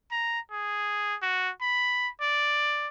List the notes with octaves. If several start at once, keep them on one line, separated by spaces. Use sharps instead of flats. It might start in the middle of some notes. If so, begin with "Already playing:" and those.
A#5
G#4
F#4
B5
D5